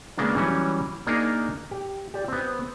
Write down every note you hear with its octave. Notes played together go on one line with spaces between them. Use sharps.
C#3 G#3 A#3 B3 D4
E3 F#3 G3 C#4
A#3 D4 D#4 G#4 A#4
G4
G4 D5
B3 C4